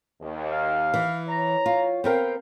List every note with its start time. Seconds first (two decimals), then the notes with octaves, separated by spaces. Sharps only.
0.21 D#2
0.50 F5
0.94 E3
1.29 C#5 A#5
1.66 F4
2.04 B3 C4 A#4 F5 G5